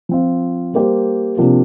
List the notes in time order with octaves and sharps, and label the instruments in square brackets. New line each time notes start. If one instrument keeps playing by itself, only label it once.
[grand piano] F3 C4 F4
G3 A#3 G4 C5
C3 F3 A#3 D4 F4